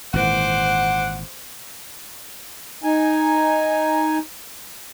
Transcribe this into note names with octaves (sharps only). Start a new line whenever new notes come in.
G#1 A#2 E3 C5 F#5 D6
D#4 G#5